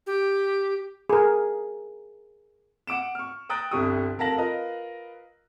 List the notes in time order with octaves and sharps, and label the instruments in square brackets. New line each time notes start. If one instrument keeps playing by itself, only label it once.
[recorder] G4
[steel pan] G#4 A#4
[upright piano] F#5 D6 D7 E7
C#6 F6
G5 A#5 D#6 F#6 A6 D7
G1 C2 G4 C#6 D#6
F1 A#4 F5 A5 A#6 F#7
F4 A#4 B4 D#5 F5